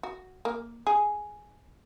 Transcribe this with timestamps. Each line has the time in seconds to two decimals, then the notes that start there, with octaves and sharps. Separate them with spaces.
0.03 F#4
0.45 A#3
0.87 G#4